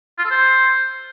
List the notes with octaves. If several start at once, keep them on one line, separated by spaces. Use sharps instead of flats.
F4
A4
C5